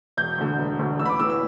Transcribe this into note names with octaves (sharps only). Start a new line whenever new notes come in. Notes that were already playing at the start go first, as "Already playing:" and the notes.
E1 G6
D2 D3
E1
D2 D3
A1 E6
B5
D6
A2 E3 E6
E6